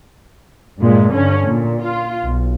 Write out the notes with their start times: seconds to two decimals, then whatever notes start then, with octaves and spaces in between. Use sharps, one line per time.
0.79 G2 A#2 G#3
1.13 G2 D3 C#4
1.47 A#2
1.82 F4
2.21 B1